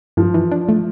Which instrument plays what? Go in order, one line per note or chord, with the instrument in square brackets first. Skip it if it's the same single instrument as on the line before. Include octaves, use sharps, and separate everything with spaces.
[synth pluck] G2 [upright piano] F3
[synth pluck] E3
D4
A3